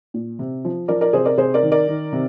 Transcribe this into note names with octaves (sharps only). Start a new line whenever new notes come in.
A#2
C3
F3
F3 A#4 D5
A#4 D5
C3 G#4 C5
A#4 D5
C3 G#4 C5
A#4 D5
D#3
A#4 D5
D#3
C3